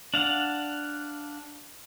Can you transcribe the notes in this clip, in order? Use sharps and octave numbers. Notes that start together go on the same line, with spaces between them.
D4 F5 F#5